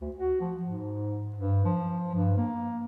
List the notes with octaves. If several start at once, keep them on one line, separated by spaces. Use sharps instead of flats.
D2
F#4
F3
G#2
G2
F3
G2
A#3